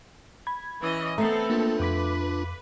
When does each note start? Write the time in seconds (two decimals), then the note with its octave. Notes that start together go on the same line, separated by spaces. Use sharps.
0.47 B5 G#6
0.82 E3 C#4 D#5
1.18 A3 B3 C4 A4 A#5 C7
1.50 A#3 D4 F4
1.80 F2 B4 D6 B6